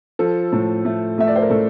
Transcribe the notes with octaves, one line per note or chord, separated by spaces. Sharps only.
F3 A4
A2
A3
A3 E5
D5
C5
A#4
A2 A4